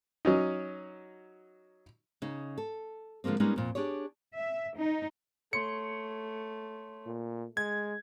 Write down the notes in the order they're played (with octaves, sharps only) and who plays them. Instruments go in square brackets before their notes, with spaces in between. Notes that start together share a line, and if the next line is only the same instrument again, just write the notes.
[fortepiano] F#3 C#4 D#4
[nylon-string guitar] C#3 D#4
A4
D3 F3 G#3 A#3 C4
G3 G#3 A#3 B3 C#4 D#4
F2 A#2
D4 G4 G#4 C#5
[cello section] E5
D#4
[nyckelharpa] A3 [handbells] C#5 C6 [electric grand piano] C#7
[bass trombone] A#2
[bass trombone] G#3 [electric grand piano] G#6